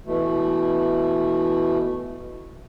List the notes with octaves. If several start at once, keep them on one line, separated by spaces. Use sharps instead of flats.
B2 E3 A3